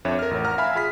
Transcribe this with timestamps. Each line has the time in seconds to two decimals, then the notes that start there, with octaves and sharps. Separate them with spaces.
0.05 F2 D4 C#5 E5
0.19 A#4 F6
0.31 A1
0.45 F#5 A#5 F6
0.58 E5 F5 G#5 B5
0.75 F4 G#4 B5 F6 B6